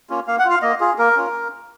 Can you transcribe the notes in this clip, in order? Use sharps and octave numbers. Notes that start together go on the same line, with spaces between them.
A#3 C#4 F4
A#3 F5
F#5
F4
F5
A#3 D#5
F4 G#4
A#3 A#4
C#4 F4